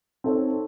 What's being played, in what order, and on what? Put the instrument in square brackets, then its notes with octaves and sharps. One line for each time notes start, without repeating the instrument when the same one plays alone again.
[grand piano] C4 D#4 A4 C#5